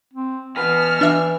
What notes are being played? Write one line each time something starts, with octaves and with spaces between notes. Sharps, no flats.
C4
B2 E3 B4 F6
E3 D4 E5